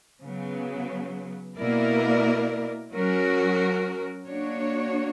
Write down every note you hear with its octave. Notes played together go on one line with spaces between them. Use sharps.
C#3 F#3 B3
B2 A#3 E4 A#4 D5
F#3 C#4 F#4 A#4
A#3 D4 F#4 C#5